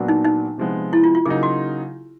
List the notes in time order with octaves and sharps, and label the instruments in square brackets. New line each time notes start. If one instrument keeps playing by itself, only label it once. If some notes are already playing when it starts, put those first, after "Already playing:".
Already playing: [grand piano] A#2 F#3 B3 D4 F#4
[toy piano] D#4
D#4
[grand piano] C3 F3 G#3 B3
[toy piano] E4
F4
F4
[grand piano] C#3 F#3 A#3 D#4 [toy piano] G#4
[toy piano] F#4